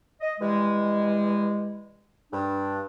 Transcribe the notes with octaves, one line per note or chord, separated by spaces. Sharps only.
D#5
E3 G3 G#3
G2 D4